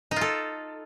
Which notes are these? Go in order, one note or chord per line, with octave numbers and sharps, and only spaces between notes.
D#4
F4
A4